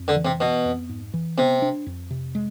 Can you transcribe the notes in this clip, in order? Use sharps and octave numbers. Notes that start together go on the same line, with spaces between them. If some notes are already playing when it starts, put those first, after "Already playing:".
Already playing: F2
D3
E3
C3
B2 B3
F2
G#2
E3
C3 B3
D4
F2
C3
G#3